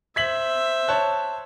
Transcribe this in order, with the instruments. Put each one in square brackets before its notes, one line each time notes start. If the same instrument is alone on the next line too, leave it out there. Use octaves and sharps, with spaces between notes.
[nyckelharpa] C5 E5 [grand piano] G#6 B6 F#7
[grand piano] C#5 A5 F#6